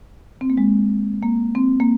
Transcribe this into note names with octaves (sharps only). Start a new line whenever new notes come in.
C4
A#3
G#3
A#3
C4
A#3